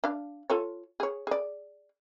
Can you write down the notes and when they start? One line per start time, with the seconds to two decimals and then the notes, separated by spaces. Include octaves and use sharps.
0.04 D4 F5
0.50 F4 A4 C#5
1.00 G#4 C#5
1.27 G#4 D5